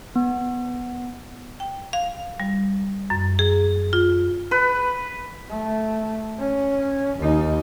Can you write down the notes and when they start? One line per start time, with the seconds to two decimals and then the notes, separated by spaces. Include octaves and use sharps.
0.16 B3
1.60 G5
1.93 F5
2.40 G3
3.10 F#2
3.39 G#4
3.93 F4
4.51 B4
5.51 A3
6.40 C#4
7.19 D#2 D#4